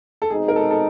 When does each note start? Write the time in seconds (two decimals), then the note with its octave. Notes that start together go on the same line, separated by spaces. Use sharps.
0.22 A4
0.30 B2 G#3 C4 D#4 G#4
0.48 A#4
0.56 A4
0.71 A4